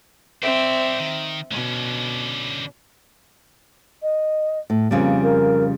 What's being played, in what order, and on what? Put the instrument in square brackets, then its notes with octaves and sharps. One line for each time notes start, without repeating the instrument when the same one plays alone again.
[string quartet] C4 E5 [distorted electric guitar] C5 D5
[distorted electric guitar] D#3
[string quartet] B2 [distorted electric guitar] D3 C#4
[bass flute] D#5
[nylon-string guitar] A2
[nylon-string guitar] F2 C#3 G3 [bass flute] A#3
[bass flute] A#4